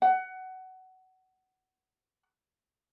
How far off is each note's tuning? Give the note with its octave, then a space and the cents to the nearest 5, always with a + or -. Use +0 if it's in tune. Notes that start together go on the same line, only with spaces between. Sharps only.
F#5 +20